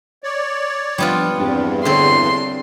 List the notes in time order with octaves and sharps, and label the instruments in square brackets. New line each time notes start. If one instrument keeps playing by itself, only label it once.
[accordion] C#5 D5
[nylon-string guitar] F3 D4 [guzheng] G3 B3 F4
[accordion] E2 G2 [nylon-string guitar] C4 D4 G4
[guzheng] D3 C4 [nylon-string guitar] G#4 C#5 [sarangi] C6